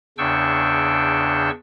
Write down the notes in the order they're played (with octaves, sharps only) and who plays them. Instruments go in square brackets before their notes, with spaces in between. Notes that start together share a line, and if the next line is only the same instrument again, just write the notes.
[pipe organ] E2 C#3 D4 G5 C#6 E6